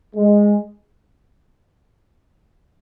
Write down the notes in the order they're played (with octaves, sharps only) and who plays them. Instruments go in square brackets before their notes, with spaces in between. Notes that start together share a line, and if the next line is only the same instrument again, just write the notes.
[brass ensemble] G#3